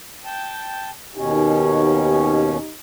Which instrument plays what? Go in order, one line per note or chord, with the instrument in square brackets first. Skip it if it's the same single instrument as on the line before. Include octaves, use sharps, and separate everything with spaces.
[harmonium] G5 A5
[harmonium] D#2 B2 C#4 [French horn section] D#4 G4